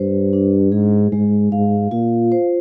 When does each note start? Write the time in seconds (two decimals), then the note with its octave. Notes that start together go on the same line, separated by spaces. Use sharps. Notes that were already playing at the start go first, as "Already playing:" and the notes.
Already playing: G2 C5
0.33 D4
0.72 G#2 G#4
1.12 G#2 G#3
1.52 G#2 F5
1.91 A#2 F4
2.32 C5